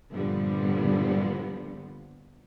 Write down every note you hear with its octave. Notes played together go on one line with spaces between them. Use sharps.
G2 A#2 D3 F3 G3 B3